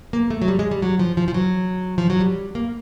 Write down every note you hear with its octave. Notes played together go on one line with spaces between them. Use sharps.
A#3
A3
F#3
G3
G#3
G3
F#3
F3
F3
F3
F#3
F3
F#3
G3
A#3